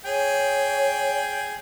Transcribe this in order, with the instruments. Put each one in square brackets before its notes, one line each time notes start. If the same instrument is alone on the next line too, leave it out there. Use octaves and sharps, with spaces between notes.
[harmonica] G#4 G5 [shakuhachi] C#5